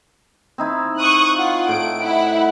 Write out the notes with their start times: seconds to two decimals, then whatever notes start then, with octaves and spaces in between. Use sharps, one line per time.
0.58 C4 D#4 E4
0.98 C#6 D#6 F#6
1.37 F4 F#5
1.68 A2 D7
2.01 E4 F#5